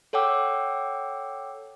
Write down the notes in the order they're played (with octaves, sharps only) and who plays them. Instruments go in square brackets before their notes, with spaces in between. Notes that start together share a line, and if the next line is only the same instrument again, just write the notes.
[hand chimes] A4 C#5 F#5 G5 D6 E6